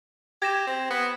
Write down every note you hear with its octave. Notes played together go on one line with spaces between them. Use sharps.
G4 G#6 A#6 E7
C4
B3